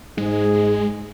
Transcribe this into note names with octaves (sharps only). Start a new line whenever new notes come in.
G#2 G#3 G#4